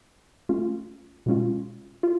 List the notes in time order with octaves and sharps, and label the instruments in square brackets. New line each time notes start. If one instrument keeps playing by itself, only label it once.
[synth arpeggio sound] A3 C#4 F4
B2 G#3 C#4 F4
F4